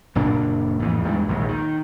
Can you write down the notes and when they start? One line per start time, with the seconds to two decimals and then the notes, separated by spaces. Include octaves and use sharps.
0.15 F#1 A#2 A#3 D4
0.79 A1 F2 G#2 E3
1.03 E2 G2 G3 G#3
1.28 A#1 D#2 G#2
1.48 D#3